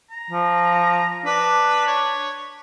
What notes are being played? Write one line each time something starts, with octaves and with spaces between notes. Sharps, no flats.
A#5
F3
D4 B4
C#5